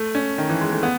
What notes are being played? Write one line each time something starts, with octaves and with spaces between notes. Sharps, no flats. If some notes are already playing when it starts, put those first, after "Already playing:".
Already playing: A3
C#4
D#3
E3
G#3
A3
B3